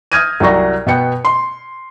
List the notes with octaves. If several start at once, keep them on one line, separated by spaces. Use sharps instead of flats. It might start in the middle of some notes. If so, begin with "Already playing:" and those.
D#6 F6 G6 G#6 A#6 D#7
C2 F#3 D5 C#6 A#6
B2 B3 B4 G5 C#7
C6